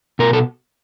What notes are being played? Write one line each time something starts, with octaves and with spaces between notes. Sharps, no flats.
B2 A#4
A4